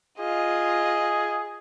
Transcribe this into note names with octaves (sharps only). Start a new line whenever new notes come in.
F4 G#4 D#5